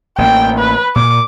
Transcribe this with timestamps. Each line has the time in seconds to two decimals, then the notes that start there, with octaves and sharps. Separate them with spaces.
0.18 A1 A#3 G5
0.59 B4
0.96 A#2 D6